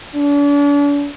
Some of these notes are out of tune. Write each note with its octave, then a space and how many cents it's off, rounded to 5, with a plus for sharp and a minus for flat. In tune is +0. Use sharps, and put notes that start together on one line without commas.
D4 -40